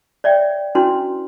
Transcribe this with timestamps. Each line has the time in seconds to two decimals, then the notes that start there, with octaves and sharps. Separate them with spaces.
0.24 C#5 D5 E5 G5
0.75 C#4 D4 E4 F#4 B4 C6